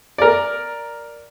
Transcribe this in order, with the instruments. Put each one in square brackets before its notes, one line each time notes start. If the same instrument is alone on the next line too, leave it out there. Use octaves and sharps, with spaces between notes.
[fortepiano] A#4 D5